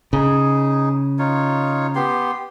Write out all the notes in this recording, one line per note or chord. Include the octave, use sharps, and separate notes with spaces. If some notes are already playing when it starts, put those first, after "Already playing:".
C#3 D#4 G#4
D#4 F4 C#5
B3 G4 C6